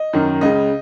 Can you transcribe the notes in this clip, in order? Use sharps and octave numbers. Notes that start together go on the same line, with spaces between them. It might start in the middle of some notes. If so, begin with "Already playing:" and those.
Already playing: D#5
F#2 D#3
C#2 C#3 D#5